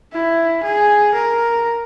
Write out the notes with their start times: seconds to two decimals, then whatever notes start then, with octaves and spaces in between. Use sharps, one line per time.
0.13 E4
0.64 G#4
1.14 A#4